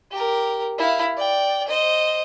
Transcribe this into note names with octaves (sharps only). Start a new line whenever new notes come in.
G4 A#4
E4 F5
D5 G5
C5 D#5